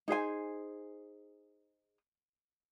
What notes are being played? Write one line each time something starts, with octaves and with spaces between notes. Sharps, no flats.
D#4 G#4 C5 G#5